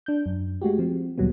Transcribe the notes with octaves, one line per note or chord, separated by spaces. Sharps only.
D4 G6
F#2
G#3 A3 F#4 G4
F3 C4
D2 A#2 F#3 G3 B3